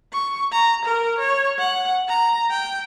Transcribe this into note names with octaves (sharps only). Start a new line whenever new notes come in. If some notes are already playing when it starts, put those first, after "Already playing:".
C#6
A#5
A#4
C#5
F#5
A#5
G5